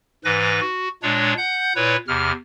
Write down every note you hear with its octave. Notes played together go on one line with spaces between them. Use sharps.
G#2 E3 B4 A#6
F#4
A#2 G#3 D4 C#5
F#5 G6
A#2 E4 B4 C#5
E2 C3 F6